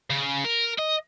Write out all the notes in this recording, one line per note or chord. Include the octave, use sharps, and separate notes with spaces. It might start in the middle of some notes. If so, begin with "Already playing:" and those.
C#3
A#4
D#5